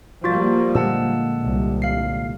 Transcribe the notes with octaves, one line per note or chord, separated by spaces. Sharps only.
F3 G3 A#3 F4 F#4 A6
A#2 D3 G#3 F#5 A5 E6
C2
F5 C7